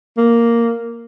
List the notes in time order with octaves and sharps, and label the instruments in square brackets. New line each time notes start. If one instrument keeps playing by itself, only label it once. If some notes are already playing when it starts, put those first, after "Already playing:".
[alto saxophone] A#3